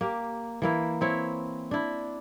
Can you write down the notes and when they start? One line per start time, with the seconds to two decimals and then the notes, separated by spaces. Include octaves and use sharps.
0.01 A#3 G4
0.62 E3 A#3 E4
1.01 C4 E4 C#5
1.71 D4 E4